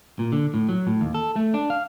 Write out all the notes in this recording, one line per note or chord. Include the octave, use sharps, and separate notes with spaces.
A#2
D3
A2
F#3
A2
D#2
A4
A3
D4
F5